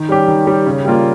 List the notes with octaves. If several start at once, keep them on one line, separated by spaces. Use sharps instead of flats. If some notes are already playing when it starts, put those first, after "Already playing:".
Already playing: D#3
G3 C#4 G4
D#3
G3 C#4 G4
C#3
G3 A#3 F4